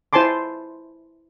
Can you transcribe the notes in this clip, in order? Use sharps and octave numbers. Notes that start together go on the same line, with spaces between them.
E4 C5 G#5 A5 C6 D6